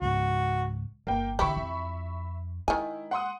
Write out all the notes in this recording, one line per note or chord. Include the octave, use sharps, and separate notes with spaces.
C#2 G#2 F#4
G1 A#3 G5
D3 E3 E4 G4 E5 B5 C#6
F2
D#3 G#3 E4 G#5
F#5 C6 D#6